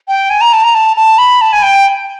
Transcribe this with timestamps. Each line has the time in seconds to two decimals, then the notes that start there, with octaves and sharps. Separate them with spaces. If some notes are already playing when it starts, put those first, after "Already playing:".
0.08 G5
0.30 G#5
0.41 A#5
0.53 A5
0.63 A#5
0.75 A5
0.96 A5
1.18 B5
1.41 A5
1.53 G#5
1.63 G5